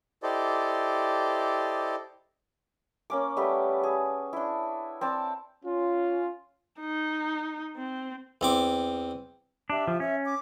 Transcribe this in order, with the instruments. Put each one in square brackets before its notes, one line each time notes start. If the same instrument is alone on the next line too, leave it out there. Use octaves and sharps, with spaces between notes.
[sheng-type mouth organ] E4 G4 A4 C5 D5 D#5
[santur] A#3 C#4 D6
G3 A3 B3 G4
G#4
D4 E4
C4 D5 A5
[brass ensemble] C#4 F4
[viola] D#4
C4
[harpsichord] E2 C4 D6
[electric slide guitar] D4 [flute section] G4 E5
[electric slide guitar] F3
[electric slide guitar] C#4 [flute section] E5
[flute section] D6